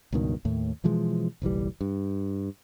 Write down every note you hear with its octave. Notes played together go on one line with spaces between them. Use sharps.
C#2 G2 B2 D#3
D#2 A2
B2 E3 F3 G#3
F#1 B1 E3 G3
G2